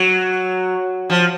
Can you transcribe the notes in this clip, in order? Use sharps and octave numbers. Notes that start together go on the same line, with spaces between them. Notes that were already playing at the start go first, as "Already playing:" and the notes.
Already playing: F#3
F3